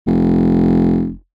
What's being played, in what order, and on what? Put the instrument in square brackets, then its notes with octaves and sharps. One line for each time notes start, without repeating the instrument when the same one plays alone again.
[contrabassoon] F1